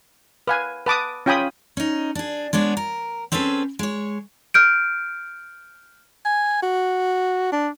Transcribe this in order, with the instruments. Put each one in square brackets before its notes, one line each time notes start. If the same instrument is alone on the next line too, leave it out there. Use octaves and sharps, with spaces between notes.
[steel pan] B4 F5 G#5
B4 A5 D6 D#6
C#4 F4 G5 G#5 B5 D#6
[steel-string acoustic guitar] C#4 D#4
D4 G#4
G#3 B3 D4 C#5
A#4
C4 C#4 G#4 A4 B4
G#3 C#5
[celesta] F6 G6 D7
[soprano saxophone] G#5
F#4
D4